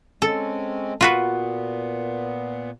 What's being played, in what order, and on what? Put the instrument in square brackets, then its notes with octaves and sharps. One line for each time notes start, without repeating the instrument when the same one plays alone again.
[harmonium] G#3 C4 C#4 [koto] A4
[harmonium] A#2 B3 [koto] F4 F#4 B4